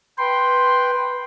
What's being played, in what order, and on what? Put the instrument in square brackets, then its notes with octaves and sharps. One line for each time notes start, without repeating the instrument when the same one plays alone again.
[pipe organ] B4 G5 [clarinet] C6